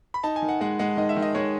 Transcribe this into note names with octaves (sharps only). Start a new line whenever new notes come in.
B5
D#4 A5
G#5
D#3
F#5
G#3 F#5
G#3 F#5
D#3 D#5
E5
D#3
D#5
G#3 C#5